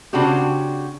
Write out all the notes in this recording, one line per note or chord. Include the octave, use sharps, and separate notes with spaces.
C#3 C4 D4 F#4 G4